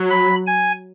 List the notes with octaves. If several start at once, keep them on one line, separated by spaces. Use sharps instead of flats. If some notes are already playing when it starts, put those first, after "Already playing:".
Already playing: F#3
B5
G#5